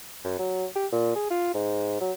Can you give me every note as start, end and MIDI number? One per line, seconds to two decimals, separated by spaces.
0.24 0.35 42
0.39 0.65 54
0.76 0.87 67
0.93 1.14 46
1.16 1.30 68
1.30 1.50 65
1.54 1.98 44
2.01 2.12 54